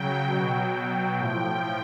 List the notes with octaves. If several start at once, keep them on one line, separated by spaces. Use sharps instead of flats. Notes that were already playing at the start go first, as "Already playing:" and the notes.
Already playing: C#3 F#3 G5
B2 F#3
A2 F3 G5